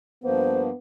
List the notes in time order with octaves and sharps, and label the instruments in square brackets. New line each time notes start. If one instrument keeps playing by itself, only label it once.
[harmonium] G2 F3 A#3 [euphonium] B3 [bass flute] C5